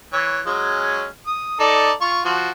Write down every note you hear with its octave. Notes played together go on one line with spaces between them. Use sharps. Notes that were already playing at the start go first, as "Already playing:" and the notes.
E3 C#5
F#3 G#3 C#4
D#6
D#4 A4 D5
F4 C#6
F3 F#4